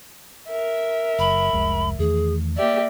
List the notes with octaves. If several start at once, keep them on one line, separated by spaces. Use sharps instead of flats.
A#4 E5
F#1 B5
F1 C2 G#3
E2 D#3 A3 G#4
A#3 G4 D5 E5